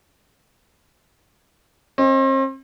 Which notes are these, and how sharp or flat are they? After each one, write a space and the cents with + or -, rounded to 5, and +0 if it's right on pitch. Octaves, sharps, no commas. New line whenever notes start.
C4 +40 D#5 +10